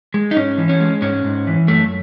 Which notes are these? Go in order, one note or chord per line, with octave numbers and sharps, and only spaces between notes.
G#3
D#4
G#2 C#4
E3
C#4
G#3
G#2 C#4
G#2
E3
F#2 A3